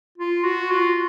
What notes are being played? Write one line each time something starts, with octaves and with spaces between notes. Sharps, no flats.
F4
F#4
F4